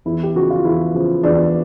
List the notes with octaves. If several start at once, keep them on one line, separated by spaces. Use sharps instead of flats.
E2 E4
G4
C#3 F3 F#4
F4
E2 E4
C#3 F3
E2 D4